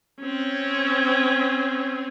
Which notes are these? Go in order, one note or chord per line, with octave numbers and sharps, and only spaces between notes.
C4 C#4